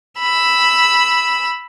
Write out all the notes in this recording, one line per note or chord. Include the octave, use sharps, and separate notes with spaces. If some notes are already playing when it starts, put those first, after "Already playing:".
B5 E6